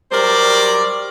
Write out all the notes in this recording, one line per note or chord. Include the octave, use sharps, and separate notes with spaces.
F#3 G3 A#4 C5 D5